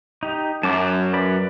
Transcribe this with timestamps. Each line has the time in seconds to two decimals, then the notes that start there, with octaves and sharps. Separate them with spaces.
0.23 D#4 G4
0.63 F#2 A5 D6
1.13 B4 D5 B5